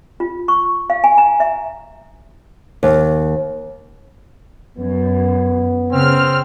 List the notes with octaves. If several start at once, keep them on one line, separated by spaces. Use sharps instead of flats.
F4
C#6
F5
G#5
A#5
E5
D#2
F#2 B3
C#3 C4 F6